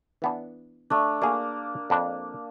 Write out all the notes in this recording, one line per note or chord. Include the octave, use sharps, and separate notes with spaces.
E3 B3 D4
A3 D4
A#3 D4 F#4 G#4
F2 D4